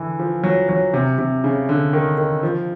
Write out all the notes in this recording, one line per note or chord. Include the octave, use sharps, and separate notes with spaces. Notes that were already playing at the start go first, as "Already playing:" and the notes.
Already playing: D3 E3
F3
F#3
F#3
C3
C3
C#3
D3
D#3
D#3
F3